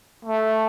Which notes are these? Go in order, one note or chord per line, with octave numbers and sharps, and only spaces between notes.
A3